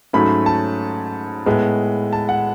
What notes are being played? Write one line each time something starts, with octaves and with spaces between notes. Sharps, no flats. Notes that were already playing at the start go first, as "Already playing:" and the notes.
G#2 F#3 A3 C#4 B5
A5
A2 G#3 B3
A5
F#5